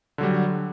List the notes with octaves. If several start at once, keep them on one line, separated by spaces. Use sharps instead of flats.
D3 F#3 G3